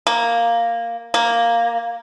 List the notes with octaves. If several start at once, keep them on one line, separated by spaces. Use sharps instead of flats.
A#3
A#3